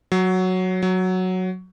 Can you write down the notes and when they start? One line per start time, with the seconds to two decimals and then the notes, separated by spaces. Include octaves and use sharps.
0.12 F#3
0.83 F#3